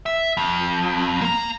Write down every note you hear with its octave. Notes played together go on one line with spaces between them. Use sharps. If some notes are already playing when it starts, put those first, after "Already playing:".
E5
F2
A#3 A#5